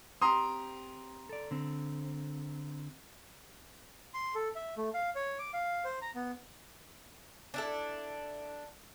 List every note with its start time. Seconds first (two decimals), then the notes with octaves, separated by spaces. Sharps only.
0.22 C4 G4 A#5 C6 D#6
1.29 A4 D5
1.51 D3 C4
4.14 C6
4.35 A4
4.56 E5
4.77 A3
4.94 F5
5.15 C#5
5.39 D6
5.53 F5
5.85 C5
6.02 A#5
6.15 B3
7.54 D4 E4 A4